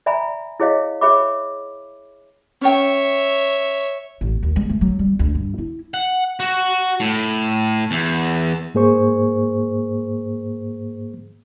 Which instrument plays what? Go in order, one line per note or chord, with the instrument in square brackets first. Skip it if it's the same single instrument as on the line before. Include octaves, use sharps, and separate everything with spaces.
[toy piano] D5 E5 G#5 A#5 B5
E4 G#4 C#5 D#5 F5
G#4 C#5 E5 B5 D6
[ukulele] C#4 G5 [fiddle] C#5 E5
[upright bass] A1
D#2
G#3
A3
F#3
G3
D2
G2
E4
[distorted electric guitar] F#5
F#4
A2
E2
[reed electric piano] G#2 A#3 G#4 C5 C#6